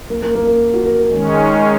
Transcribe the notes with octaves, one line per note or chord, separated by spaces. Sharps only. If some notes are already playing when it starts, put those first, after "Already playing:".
A#3
A#3
A#3
A#3
F#4
A#4
A#4
D#3 G#3 C#4